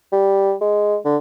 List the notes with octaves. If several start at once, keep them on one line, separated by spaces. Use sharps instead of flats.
G3
G#3
D3